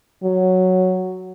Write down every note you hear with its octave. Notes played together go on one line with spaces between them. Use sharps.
F#3